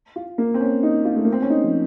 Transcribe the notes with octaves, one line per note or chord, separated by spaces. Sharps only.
F4
A#3
C4
C#4
D#4
F4
A3
A#3
C4
C#4
D#4
F3